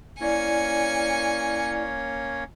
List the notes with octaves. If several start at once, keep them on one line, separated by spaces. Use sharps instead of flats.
A#3 C#4 E4 C#5 D5 G#5 C#7